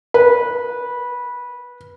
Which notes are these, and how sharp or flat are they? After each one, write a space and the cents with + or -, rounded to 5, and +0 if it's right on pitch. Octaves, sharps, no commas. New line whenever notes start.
B4 -15